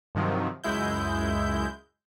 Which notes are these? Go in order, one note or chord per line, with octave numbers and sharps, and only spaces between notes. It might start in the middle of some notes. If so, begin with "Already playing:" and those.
G2 C3 D#3 F3 F#3
C#2 F#2 G#3 E4 G6